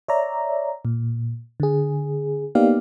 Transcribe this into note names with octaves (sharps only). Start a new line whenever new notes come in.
C#5 D5 E5 A#5
A#2
D3 G#4
A#3 B3 D#4 G4 D5 F5